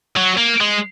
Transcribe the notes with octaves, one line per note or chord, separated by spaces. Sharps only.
F#3
A#3
G#3